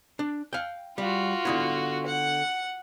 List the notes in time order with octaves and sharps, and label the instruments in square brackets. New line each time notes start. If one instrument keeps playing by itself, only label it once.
[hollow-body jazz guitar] D4
F5 G5
[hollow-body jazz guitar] G3 [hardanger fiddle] F4 F#4
[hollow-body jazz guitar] D3 B3 E4
[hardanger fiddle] F#5